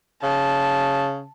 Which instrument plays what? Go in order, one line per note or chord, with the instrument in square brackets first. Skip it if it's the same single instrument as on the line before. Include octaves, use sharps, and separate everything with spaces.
[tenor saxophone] C#3 [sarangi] A5